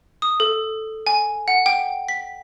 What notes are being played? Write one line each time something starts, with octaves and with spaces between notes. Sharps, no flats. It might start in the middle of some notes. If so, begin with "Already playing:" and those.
D#6
A4
G#5
F#5
G5
B6